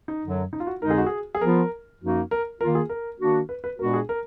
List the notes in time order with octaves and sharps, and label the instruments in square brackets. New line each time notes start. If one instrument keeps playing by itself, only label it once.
[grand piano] D#4
[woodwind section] F#2 D3 F#3
[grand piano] D#4
F4
F#4
[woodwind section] F2 D3 G#3 D#4 [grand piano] A#4
[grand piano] G#4
F#4
G#4
G#4
[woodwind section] F3 B3 F4 [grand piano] A#4
[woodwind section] F#2 F3 A#3 D#4 F#4
[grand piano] A#4
[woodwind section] D#3 A#3 F4 [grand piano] A#4
[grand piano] G#4
A#4
[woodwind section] D#3 A#3 D4 F#4
[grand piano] B4
B4
[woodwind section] A#2 G#3 B3 D4 F#4 [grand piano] A#4
[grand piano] G#4
A#4